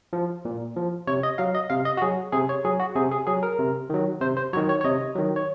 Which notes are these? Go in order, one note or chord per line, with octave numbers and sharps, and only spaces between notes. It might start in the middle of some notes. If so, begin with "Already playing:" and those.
F3
A#2
F3
C3 C#5
D#5
F#3 F5
D#5
C3 F5
D#5
F#4
F#3 G#4
C3 G#4
C#5
F#3 G#4
F#4
C3 G#4
G#4
F#3 G#4
A#4
C3
D#3 F#3
C3 C5
C5
D#3 F#3 C#5
C#5
C#5
C3 D#5
D#3 F#3
C#5